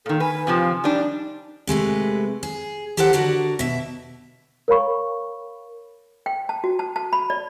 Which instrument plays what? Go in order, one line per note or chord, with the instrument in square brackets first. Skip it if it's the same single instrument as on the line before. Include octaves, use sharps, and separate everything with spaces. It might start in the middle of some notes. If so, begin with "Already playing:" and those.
[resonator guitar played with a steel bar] A#2 D#3 [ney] A4
[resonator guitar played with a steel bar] B4 [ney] G#5
[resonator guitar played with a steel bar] F2 C3 F3
[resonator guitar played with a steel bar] G3 D4 [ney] D#4
[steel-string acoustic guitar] C3 G#3 A3 B4
G#4
G4 A4 A#4 C5 C#5 F#5
D3 D4 F#4 A#4
B2 E5
[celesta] A#4 C#5 F5 B5 C#6
[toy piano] G5
A5
F#4
A5
A5
B5
D5